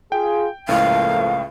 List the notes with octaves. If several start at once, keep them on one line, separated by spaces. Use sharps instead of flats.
F4 G#4 G5
C#2 A2 F3 A3 A#3 F5